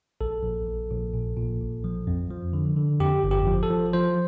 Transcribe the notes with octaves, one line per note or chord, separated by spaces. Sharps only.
A#1 A4
A#1
A#1
A#1
A#2
A#2
A#1
F3
F2
F3
D3
D3
F2 G4
G1
G4
F3
A4
F3
F3 C5